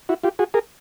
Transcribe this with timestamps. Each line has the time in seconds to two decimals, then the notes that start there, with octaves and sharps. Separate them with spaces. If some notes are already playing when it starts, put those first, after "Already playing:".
0.09 E4 F#4
0.23 F4 G4
0.39 F#4 G#4
0.54 G#4 A#4